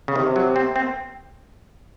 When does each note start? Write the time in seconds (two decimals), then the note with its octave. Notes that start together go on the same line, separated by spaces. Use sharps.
0.08 C#3
0.15 C3 D#3
0.36 F#3
0.56 C4
0.76 C4